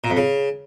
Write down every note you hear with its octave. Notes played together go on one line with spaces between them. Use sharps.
A#2
F2
C#3